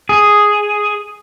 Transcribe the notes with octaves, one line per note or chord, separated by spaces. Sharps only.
G#4